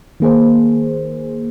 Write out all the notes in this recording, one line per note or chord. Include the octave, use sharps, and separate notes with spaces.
D#3 A#3 G#4 C5